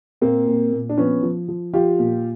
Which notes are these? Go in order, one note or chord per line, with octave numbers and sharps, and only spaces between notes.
A#2 A#3 C4
A#2
A#2
D4
F3 B3 C#4
F3
F3
F3 F4 G4
A#2